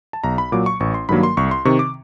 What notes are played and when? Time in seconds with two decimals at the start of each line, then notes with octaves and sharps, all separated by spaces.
0.13 A5
0.24 B1 A#5
0.38 B5
0.52 A#2 F#3 D6
0.66 C#6
0.80 A1 C#6
0.94 C6
1.09 G2 D#3 F#3 A#3 B5
1.23 C6
1.37 C2 C#6
1.51 C6
1.65 C3 D#3 C#6
1.79 D6